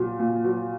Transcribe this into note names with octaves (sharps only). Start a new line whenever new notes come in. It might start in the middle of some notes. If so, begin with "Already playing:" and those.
Already playing: A#2 F#3
A#2
F#3